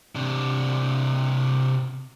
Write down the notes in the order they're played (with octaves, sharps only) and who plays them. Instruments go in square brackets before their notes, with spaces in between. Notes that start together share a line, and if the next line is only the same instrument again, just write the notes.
[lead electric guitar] C3 D4